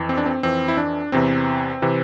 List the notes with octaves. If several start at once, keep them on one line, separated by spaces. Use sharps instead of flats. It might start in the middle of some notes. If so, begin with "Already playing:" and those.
Already playing: F2 E3
C4
D4
C4
F2 E3 C4
E4
D4
E2 C3 E3 C4
C3 E3